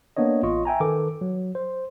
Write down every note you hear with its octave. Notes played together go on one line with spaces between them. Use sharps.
A#3 B3 D4 C#5 D#5
A1 F4 D#5 C#6
E5 G5 G#5 A#5
D#3 A4 B4 D6
F#3
C5